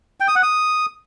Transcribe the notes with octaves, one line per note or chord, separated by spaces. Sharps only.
G5
D#6
F#5
D#6